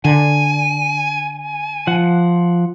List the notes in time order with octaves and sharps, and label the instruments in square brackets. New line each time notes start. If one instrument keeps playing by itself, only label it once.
[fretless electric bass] D3 [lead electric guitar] G#5
[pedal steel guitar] F3 F#5